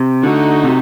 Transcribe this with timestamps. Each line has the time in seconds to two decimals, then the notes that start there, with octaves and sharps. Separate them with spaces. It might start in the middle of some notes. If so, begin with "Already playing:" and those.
Already playing: C3
0.23 D3 A3 D#4 F#4
0.64 C3